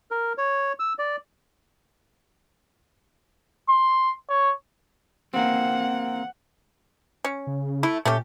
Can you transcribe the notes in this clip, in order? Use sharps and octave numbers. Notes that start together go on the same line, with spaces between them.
A#4
C#5
E6
D5
C6
C#5
A#3 C4 F#5
C#4
C#3
A3 E4
A#2 A3 C#4 G4